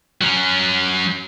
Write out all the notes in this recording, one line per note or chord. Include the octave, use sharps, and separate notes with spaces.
F#3 C#4